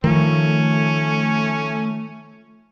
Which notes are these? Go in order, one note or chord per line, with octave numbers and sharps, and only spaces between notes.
D#3 F3 A3 C#4